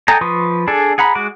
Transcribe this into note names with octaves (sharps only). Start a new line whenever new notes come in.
A4 D#5 G5 G#5 A#5
F3 B4 C6 C#6 D#6
D4 G#4 A4 D5
G#4 F#5 A#5 B5
G#3 F#4 D6